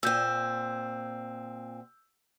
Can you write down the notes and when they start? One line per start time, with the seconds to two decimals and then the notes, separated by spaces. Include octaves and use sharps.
0.03 A#2 C4 E6 G6